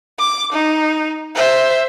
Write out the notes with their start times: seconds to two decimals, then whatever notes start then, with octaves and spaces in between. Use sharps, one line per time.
0.19 D6
0.53 D#4
1.35 C5 E5